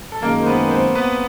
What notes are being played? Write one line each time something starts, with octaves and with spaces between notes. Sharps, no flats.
A4
F#2 D#3 G#3 A#3 A#4
C5
B3 B4
C4 C5
B3 B4